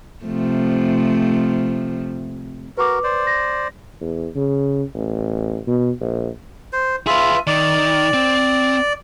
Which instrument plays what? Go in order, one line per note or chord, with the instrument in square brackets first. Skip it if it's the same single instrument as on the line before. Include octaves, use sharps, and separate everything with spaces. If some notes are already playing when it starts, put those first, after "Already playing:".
[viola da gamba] C3 F3 A3
[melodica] F#4 A#4 [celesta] B4 D6
[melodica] C5 D5
[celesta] A#6
[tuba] E2
C#3
A1
B2
A#1
[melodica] C5
[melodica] F4 E5 [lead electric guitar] G#4 B4
[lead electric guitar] D#3 [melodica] D5
[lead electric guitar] C4